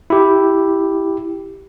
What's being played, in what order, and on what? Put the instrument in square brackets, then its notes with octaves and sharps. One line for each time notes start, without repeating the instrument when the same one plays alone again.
[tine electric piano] E4 G4